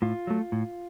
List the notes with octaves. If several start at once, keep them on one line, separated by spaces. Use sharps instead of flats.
A2 F4
F#3 A3
A2